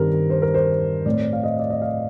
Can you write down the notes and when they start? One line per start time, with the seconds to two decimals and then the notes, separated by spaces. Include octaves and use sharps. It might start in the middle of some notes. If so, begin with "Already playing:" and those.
Already playing: G2 D#3 G3 C4 A#4
0.30 C5
0.42 A#4
0.54 C5
1.06 A2 A3 C4 D5
1.33 F5
1.44 D#5
1.59 D5
1.70 D#5
1.82 F5